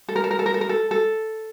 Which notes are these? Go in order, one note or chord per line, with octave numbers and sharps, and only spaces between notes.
A4
A#4
A4
A#4
A4
A#4
A4
A#4
A4
A4